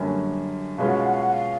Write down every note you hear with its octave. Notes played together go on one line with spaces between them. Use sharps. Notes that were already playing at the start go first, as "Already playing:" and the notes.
Already playing: F#2 D3 G3 A#3 C#4
B2 G#3 C#4 F4 F5
F#5
F5
F#5
F5
F#5
F5